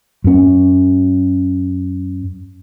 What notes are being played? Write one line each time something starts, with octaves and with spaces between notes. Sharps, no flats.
F#2 C#4